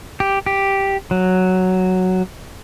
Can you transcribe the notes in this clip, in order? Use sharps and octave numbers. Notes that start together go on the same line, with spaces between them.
G4
G4
F#3